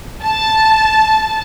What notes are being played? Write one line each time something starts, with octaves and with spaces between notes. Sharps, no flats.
A5